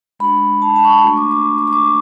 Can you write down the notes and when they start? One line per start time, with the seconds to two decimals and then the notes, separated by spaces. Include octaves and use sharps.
0.20 G#3 D4 F#4 B5
0.62 A5
0.76 A5
0.85 C#6
0.90 B5
1.03 A3 D4 F#4 C#6
1.17 D6
1.31 D6
1.58 D6
1.67 C#6
1.73 D6